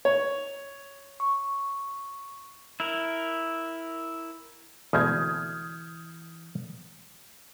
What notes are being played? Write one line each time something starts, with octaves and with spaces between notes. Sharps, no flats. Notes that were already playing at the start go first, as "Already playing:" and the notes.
C#5
C#6
E4 A#4
D2 B2 E3 G#3 D#6 F6 G6 G#6